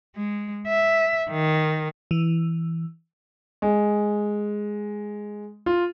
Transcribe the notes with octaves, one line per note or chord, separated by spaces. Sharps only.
G#3
E5
D#3
E3
G#3
F4